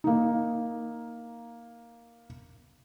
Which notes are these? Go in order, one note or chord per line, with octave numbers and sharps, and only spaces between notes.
A#3 D#4